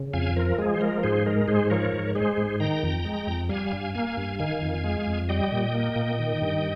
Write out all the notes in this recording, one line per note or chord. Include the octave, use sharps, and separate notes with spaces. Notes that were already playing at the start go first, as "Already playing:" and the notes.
Already playing: C#3
F2 F5 G#5
F3 A#4
G#3 G#4
C5
F3 A#4
G#2 G#4 C5
G#3 A#4
G#2 G#4 C5
F3 A#4 C#5
G#2
G#3 G#4 C5
G#2
D#3 G5 A#5
F2
G#3
F2
G3 F5 G#5
G2
A#3 F5 G#5
G2
D#3 F5 G#5
F2
G#3
F2
G3 D#5 G5
A#2
A#3
A#2
D#3
G2